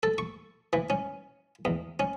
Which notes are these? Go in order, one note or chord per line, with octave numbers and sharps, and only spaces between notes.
A4
C#6
E3
C#4
E2
C#4